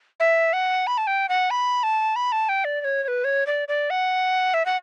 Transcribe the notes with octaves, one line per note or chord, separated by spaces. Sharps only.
E5
F#5
B5
A5
G5
F#5
B5
A5
B5
A5
G5
D5
D5
C#5
C#5
B4
C#5
D5
D5
F#5
E5
F#5